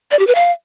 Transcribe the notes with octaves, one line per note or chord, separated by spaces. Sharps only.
D5
G4
B4
F5